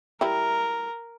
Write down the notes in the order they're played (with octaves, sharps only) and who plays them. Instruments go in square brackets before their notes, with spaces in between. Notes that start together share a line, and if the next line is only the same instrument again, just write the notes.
[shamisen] G3 E4 [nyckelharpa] A#4